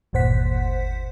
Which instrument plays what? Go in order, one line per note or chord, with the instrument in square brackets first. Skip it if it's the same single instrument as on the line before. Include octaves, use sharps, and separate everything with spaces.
[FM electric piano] G1 D#2 A#2 C5 F#5 B6